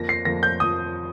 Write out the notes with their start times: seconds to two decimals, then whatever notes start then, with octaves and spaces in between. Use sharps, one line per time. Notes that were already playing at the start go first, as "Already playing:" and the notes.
Already playing: F2 F3 A#3 A#6
0.09 C7
0.25 F2 F3 A#3 A#6
0.43 G6
0.60 F3 D#6